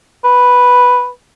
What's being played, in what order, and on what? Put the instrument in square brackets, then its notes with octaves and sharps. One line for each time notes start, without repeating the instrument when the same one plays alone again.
[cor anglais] B4